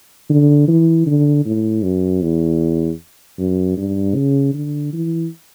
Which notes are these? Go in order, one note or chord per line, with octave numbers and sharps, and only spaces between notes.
D3
E3
D3
A2
F#2
E2
F#2
G2
C#3
D3
E3